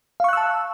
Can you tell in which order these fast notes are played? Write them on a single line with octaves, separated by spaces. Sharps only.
F5 C#6 F#6 E6 A5